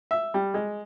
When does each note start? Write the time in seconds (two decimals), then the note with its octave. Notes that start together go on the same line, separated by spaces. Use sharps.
0.11 E5
0.34 G3
0.54 G#3